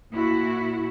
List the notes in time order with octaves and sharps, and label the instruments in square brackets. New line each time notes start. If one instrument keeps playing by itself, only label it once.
[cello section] A#2 E4 F#4